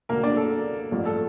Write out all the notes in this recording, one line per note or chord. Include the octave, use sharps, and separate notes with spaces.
E1 D2 D3 A#3 A#4
D4 D5
A4
A1 G2 F3 A#3
A4